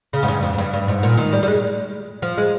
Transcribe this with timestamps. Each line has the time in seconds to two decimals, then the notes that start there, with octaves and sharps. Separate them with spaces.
0.13 C#3
0.23 G#2
0.28 G2
0.43 F2
0.53 F2
0.58 G2
0.73 G2
0.88 G#2
1.03 A#2
1.18 D#3
1.33 G3
1.43 G3
1.48 G#3
2.22 F3
2.38 G#3